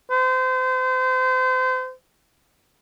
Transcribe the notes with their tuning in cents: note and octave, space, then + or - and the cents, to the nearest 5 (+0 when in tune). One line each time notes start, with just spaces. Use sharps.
C5 -35